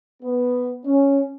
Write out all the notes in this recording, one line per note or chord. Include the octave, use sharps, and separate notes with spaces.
B3
C#4